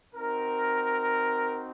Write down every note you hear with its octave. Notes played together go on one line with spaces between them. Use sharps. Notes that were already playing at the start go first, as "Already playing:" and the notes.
C4 D#4 F#4 A#4